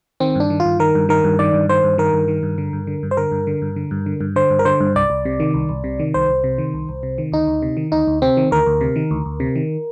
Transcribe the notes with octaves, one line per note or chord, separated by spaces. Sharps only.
D#3 C4
G2 D4
D#3
F4
G2
D#3 A#4
G2
D#3 A#4
G2
D#3 D5
G2
D#3 C5
G2
D#3 A#4
G2
D#3
G2
D3
G2
D3
G2
C5
D3 A#4
G2
D3
G2
D3
G2
D3
G2
D3 C5
G2
A#4
D3 C5
G2
C2 D5
C2
C3
D#3
C2
C2
C3
D#3
C2 C5
C2
C3
D#3
C2
C2
C3
D#3
D2 D#4
D2
C3
D#3
D2 D#4
D2
C3 C4
D#3
D2 A#4
D2
C3
D#3
D2
D2
C3
D#3